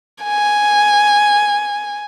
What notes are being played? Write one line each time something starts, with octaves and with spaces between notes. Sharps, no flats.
G#5